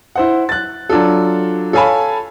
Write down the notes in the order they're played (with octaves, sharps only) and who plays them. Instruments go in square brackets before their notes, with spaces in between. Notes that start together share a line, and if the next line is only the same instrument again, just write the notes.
[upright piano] E4 C5 F#5
F#6 A6
F#3 D4 F4 A4
A4 C#5 F5 G#5 A5 B5